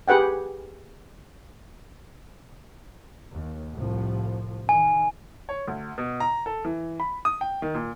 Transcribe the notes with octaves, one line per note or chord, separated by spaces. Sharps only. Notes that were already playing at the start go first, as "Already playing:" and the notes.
G4 G#4 B4 F#5 G5
D#2
C2 A2 F3
D#3 G#5
C#5
D2
B2
A#5
A4
E3
B5
D#6
G5
D#3
A#2